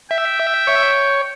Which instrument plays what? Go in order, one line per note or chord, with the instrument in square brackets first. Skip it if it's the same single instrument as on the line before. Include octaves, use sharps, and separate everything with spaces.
[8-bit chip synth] E5 [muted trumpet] G5
[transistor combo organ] C#5